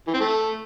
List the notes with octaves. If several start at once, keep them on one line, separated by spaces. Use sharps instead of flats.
E3
C4
A3